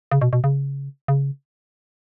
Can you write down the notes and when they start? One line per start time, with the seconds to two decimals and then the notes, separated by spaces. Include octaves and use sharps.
0.11 C#3
0.21 B2
0.33 B2
0.44 C#3
1.08 C#3